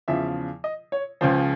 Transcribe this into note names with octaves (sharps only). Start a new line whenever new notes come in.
E2 C#3 F3 E5
D#5
C#5
C#2 C#3 F3 C5